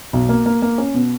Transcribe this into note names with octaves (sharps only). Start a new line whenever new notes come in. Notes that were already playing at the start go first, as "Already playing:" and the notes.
B1
A#3
A#3
A#3
C#4
B2